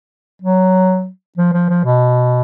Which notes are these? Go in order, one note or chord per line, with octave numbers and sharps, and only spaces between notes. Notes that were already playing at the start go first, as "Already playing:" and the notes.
F#3
F3
F3
F3
B2